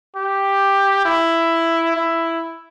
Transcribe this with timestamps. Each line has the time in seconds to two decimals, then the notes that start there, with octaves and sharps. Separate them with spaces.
0.16 G4
1.05 E4
1.96 E4